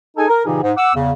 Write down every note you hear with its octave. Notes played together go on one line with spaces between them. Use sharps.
D#4 G#4 A4 G#5
A#4
A#2 C#3 E3 D#4 G4 G#4
G#2
F#5 D6 E6
E2 C#3